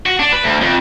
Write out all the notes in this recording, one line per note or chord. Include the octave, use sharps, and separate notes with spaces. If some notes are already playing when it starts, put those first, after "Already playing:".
F#4
D4
B4
D2
F2